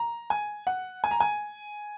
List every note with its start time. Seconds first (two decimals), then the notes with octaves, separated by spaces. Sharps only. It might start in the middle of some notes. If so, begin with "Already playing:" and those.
Already playing: A#5
0.30 G#5
0.67 F#5
1.04 G#5
1.11 A#5
1.20 G#5